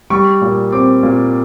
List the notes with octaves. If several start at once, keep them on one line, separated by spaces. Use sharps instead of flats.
G3 C#6
A#2
C4 D6
A#2